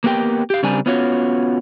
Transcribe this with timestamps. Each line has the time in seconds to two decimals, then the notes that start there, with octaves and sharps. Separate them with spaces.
0.04 A#3 B3 G4 A#4 G5
0.50 G4 F5
0.63 C#3 G3 C4 D4 A#4 G#5
0.86 B3 C#4 F4 F#4 C#5